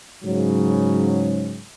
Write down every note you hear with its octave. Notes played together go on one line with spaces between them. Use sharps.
G#2 C#3 F#3